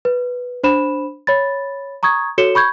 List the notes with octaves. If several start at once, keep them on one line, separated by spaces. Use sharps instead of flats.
B4
D4 C5 B5 E7
C#5 B5 A6
A#5 C#6 D#6 G#6
F#4 A4 C#5 C#7 E7 G7
B5 C#6 G6 G#6